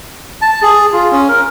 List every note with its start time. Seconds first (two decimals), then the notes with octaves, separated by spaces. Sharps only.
0.42 A5
0.62 G#4
0.93 F4
1.12 C#4
1.29 A#4